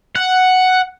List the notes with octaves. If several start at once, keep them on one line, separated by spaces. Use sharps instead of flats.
F#5